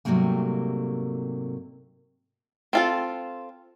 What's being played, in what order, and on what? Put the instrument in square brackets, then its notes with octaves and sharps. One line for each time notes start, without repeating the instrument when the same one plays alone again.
[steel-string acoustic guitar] G#2 C3 F#3 G3 A3 A#3
[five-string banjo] C4 F4 A4